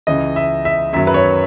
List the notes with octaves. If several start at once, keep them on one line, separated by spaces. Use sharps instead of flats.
C#2 C#3 E3 D#5
E5
E5
F#2 D#3 F#3 E5
B4
C#5